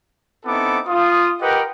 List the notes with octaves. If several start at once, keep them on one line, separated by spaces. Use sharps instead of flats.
B3 C4 D#4 E4 A4 D6
F4 D#6
G4 A#4 B4 D#5 F#5 G5